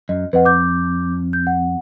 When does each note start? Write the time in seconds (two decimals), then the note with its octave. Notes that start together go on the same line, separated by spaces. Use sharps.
0.09 F#2 D#5
0.33 F2 B4 D#5 F#5
0.45 D6 G6
1.33 G6
1.47 F#5